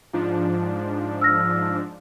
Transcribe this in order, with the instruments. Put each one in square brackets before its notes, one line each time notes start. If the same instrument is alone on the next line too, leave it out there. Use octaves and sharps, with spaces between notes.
[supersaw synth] G#2 F3 D4 [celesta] F4
[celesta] E6 F6 A#6